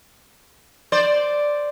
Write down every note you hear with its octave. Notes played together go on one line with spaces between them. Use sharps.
C5 D5